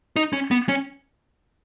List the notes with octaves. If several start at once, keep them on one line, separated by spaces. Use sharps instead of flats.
D#4
C#4
B3
C#4